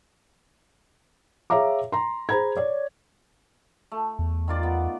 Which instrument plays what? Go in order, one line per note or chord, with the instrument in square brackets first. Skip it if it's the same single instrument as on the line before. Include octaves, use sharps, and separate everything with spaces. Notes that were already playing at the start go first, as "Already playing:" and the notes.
[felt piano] G#4 C#5 E5 F5 A#5 D6
A#5 C6
G#4 C5 A#5 B5 G#6
C#5 D5
[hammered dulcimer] A3
[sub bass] E2
[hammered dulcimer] D#3 F4 D5
B3